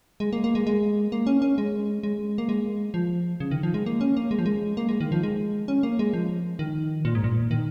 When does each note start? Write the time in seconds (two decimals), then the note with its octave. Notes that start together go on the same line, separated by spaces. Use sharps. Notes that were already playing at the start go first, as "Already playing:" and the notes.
0.20 G#3
0.33 A#3
0.44 A#3
0.55 G#3
0.67 G#3
1.12 A#3
1.27 C#4
1.42 C#4
1.58 G#3
2.03 G#3
2.38 A#3
2.49 G#3
2.94 F3
3.40 C#3
3.51 D#3
3.63 F3
3.74 G#3
3.86 A#3
4.01 C#4
4.17 A#3
4.31 G#3
4.39 F3
4.46 G#3
4.77 A#3
4.89 G#3
5.01 D#3
5.12 F3
5.23 G#3
5.68 C#4
5.83 A#3
5.99 G#3
6.14 F3
6.59 D#3
7.05 A#2
7.15 G#2
7.24 A#2
7.51 D#3